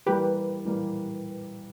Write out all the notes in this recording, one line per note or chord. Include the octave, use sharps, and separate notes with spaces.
E3 G3 A#3 G4 B4
E3 G3 A#3